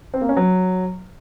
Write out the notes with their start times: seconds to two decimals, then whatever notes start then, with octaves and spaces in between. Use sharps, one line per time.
0.14 C4
0.21 A#3
0.29 C#4
0.37 F#3